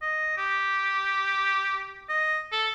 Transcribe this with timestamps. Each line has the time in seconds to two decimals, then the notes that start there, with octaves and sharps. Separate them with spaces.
0.02 D#5
0.37 G4
2.09 D#5
2.52 A4